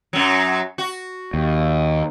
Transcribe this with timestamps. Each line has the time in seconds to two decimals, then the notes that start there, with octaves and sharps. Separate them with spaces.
0.13 F#2 F#3
0.78 F#4
1.34 D#2